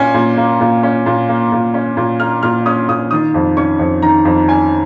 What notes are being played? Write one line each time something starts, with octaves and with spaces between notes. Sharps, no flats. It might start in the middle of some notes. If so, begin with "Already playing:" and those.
Already playing: A#2 A#3 C#4 G#5
A#2
A#3
A#2
C#4
A#2
A#3
A#2
C#4
A#2
A#3 F6
A#2 F6
C#4 D#6
A#2 D#6
D#3 D#6
F2
C#4 C#6
F2
D#3 A#5
F2
C#4 G#5